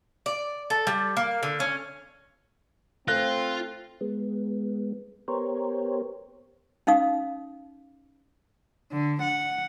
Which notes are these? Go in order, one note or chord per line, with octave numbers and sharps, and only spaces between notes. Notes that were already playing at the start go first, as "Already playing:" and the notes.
D5
A4
G3
A#3
D3
C#4
A3 C4 F4 F#6 A#6
G#3 B3
B3 G4 A#4 C5 C#5
C#4 D#4 F5 D#6
D3
F#5